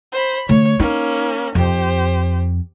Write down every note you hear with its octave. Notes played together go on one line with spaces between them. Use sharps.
C5 B5
D3 A3 C#5
A#3 C#4 D#4
F2 G4 C5